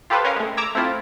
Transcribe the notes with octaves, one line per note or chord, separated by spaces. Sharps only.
F4 G4 A4 B4 C5
C#4 A#4 F5
G#3 A3
A#5 D6 E6 G#6
A3 C4 E4 F4